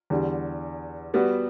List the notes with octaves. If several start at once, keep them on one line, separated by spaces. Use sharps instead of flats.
E2 D3 G3
G3 B3 F#4